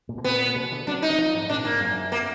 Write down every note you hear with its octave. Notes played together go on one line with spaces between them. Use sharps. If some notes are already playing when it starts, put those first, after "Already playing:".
A#2
B2
A#2 B3
B2
D3
F#3 D4
D#4
D#3
F3
G#2
A#2 D4
G#2 A#3
F#2
A#3